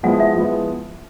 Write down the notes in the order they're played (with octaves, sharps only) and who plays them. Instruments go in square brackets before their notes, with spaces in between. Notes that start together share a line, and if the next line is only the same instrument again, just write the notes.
[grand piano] F3 G#3 B3 E4 [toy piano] F#5
[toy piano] E5
[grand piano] F3 G#3 B3 E4